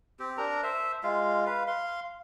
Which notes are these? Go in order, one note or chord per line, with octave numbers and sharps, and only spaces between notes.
C4 G4
D4 A#4 A#5
C5 E5
G#3 F4 F5
B4 F5
F5 C6